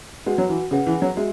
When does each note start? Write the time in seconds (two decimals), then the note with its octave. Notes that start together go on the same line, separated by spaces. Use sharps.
0.26 G#3 F#4 B4 F#5
0.38 F#3
0.49 E3
0.71 C#3 C#4 G#4 B4 F#5
0.87 E3
1.02 F#3
1.16 G#3 F#4 E5